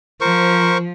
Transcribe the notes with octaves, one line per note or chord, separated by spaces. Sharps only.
F3 A#4 C5 C#6